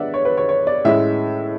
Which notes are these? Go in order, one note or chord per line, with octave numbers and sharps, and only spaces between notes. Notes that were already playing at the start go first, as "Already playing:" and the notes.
Already playing: G#3 B3 D4 D5 E5 F#5
C#5
B4
C#5
C#5
D5
A2 G#3 C#4 E5